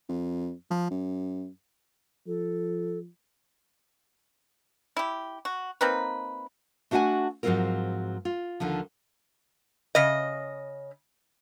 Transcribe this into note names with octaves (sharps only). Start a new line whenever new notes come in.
F2
F3
F#2
F3 A4
E4 G4
F#4
A#3 C4 D#4 B4
A3 D4 F#4 E5 F#5 G#5
G#2 F3 F#3 C4 F4 A#4
F4
D#2 D3 D#3 F3
C#3 D#5